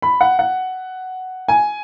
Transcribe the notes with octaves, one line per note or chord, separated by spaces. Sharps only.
B5
F#5
F#5
G#5